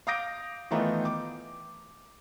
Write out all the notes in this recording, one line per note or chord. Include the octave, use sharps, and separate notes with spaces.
F5 D6 D#6 G6 A#6 D7
D#3 E3 A3 B3 D#4 F4
D6